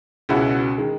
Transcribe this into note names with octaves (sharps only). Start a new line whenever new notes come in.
C#2 B2 G#3 C#4 E4 F#4
D#3 G#3